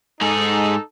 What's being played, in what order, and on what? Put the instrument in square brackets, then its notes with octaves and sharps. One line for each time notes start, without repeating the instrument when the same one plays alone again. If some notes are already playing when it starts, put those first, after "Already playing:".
[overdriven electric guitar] G#2 G#4 [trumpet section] D#4 A4